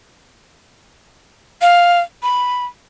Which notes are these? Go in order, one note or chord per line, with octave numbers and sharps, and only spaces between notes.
F5
B5